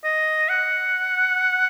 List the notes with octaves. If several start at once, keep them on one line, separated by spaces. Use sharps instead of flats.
D#5
F#5